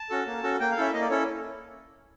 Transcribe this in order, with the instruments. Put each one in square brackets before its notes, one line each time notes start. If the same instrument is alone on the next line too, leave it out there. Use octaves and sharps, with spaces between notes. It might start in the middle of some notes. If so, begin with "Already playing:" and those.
Already playing: [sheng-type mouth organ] A5
C#4 F#4 A4
A#3
C#4 F#4 A4
A#3 G5
F5
C#4 E4 A4 E5
A#3 D#5
D5
C#4 E4 A4 C#5